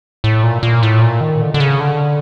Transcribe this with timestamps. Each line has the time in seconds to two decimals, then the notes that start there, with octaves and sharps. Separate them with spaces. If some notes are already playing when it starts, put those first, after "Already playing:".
0.24 A2
0.43 A#2
0.63 A#2
0.83 A2
1.01 A#2
1.21 D#3
1.41 D3
1.54 D3
1.60 C#3
1.80 D3